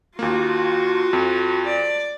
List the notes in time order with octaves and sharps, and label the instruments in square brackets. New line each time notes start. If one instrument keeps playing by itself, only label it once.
[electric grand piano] D#2 A#3 [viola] F4 F#4
[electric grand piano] F2
[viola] D5